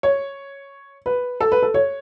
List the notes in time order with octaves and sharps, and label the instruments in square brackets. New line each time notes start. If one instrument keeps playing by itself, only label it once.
[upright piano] C#5
B4
A4
B4
A4
C#5